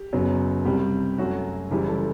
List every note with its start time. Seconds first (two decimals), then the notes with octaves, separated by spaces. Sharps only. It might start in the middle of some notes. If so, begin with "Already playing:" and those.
Already playing: G4
0.13 F#1 F#2 F#3 B3
0.65 C2 C3 G3 G4
1.18 F#2 F#3 A3 F#4
1.71 F#1 F#2 E3 G3 G4
1.88 A4